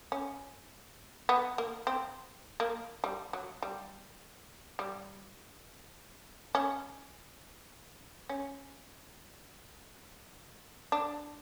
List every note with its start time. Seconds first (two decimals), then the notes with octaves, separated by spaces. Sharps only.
0.12 C#4
1.29 B3
1.58 A#3
1.87 C4
2.60 A#3
3.04 G3
3.33 F#3
3.62 G3
4.79 G3
6.55 C#4
8.29 C#4
10.92 D4